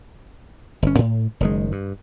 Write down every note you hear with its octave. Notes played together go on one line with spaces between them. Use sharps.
G1 C#4
A2
F#1 D#3 G#3
G2